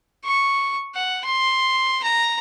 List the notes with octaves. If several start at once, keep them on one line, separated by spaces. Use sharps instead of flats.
C#6
F#5
C6
A#5